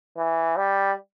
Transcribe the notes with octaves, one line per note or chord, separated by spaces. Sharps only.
E3
G3